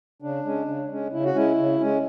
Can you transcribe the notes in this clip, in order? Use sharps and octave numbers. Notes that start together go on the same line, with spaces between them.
C#3 D4
G#3 C#4
C#3
G#3 C#4
C#3 E4
F#4
G#3 C#4 E4
C#3
G#3 C#4